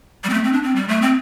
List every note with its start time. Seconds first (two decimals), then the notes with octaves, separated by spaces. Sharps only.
0.24 G3
0.29 C4
0.34 A3
0.44 C4
0.53 D4
0.63 C4
0.76 G3
0.88 A3
1.02 C4